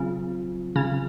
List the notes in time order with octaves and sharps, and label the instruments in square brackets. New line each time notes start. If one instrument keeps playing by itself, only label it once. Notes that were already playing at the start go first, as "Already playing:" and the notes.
Already playing: [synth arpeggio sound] C#3 [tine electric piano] F#3 C4 F4
[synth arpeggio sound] C#3